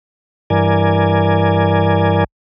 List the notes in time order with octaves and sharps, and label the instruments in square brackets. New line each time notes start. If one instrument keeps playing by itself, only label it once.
[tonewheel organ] G2 E3 A#4 D5 G#5